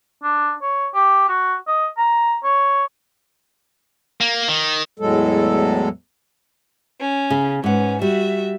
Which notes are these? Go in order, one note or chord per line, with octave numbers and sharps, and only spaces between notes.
D4
C#5
G4
F#4
D#5
A#5
C#5
A#3
D#3
E2 A2 F#3 G#3 A4
C#4
C#3
G#2 C#4 B4 F#5
G3 F#4 E5